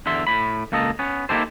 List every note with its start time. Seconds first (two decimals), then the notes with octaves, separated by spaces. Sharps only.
0.06 E2 D3 E5 C6
0.27 A2 B5
0.72 C#2 A#3 A4 D#5
0.99 B3 C#4
1.29 A#3 D#4 E4 G4 A4 C5